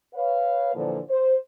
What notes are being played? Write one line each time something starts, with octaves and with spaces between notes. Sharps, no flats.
B4 C#5 F5
A#2 D3 E3 F3
C5